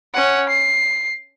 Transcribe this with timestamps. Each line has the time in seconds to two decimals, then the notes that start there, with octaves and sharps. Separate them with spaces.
0.14 C#4 F#5
0.49 C7